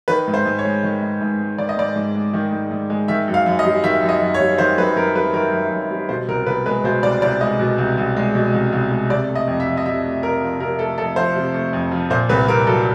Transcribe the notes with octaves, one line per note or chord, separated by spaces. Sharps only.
D#3 B4
G#2
C5
G#2
C#5
G#3
D#3
G#2
G#2
G#3
D#3 D5
D#5
G#2 D5
G#2
G#3
D#3
G#2
G#2
G#3
D#3 E5
F#2
F5
F#2
D#5
G3
D#3 E5
F#2
D#5
F#2
C#5
G3
D#3 C5
F#2 B4
F#2 A#4
G3 B4
D#3 A#4
F#2
F#2
G3
B2 C5
C2 A#4
C2 B4
G#3 B4
B2 C5
C2 D5
C2 D5
G#3 D#5
B2
C2
C2
G#3
B2
C2
C2
G#3
C3 D5
A3
D#5
F2
E5
F3
D#5
C3 E5
A3
F2 A#4
F3
C3 A#4
A3 A4
F2 A4
F3 C5
C3
A3
F2
F3
A#2 C5
C2 B4
C2 A#4
F#3 A4